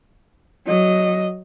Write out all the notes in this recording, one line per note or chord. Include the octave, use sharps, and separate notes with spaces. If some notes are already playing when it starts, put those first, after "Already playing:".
F#3 D#5